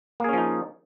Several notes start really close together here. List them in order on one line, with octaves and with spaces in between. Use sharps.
A#3 G#4 C#4 F3 D#4